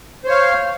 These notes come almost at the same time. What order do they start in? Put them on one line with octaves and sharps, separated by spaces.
C5 C#5 F5